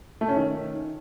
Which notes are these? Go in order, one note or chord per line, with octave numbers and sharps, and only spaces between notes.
A3
C#4
D#3